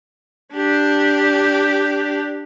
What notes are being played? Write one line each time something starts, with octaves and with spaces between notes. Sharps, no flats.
D4 G4